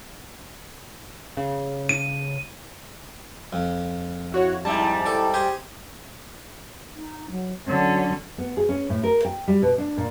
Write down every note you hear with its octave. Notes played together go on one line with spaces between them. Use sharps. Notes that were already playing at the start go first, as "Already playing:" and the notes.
C#3
D#7
F2
E4 F#4 C#5
G#2 G3 E4 A5
A4 D5
G4 G#4 C5
D#4
F#3
D3 F#3 C#4
B3
G#4
C#4
A2
A#4
G5
G3
B2
D4
A#2